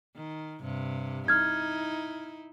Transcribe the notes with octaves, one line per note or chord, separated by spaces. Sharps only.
D#3
G2 C3
D#4 E4 F6 G#6